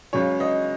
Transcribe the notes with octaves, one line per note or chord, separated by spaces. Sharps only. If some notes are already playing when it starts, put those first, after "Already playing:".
C#2 C#3 F#3 C#5
D#5